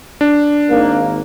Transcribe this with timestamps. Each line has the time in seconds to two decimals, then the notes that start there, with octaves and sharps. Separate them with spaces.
0.21 D4
0.69 G#1 D#3 A#3